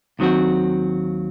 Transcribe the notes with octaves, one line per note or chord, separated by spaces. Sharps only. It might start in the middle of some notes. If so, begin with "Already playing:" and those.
D#2 D#3 F#3 C4 F#4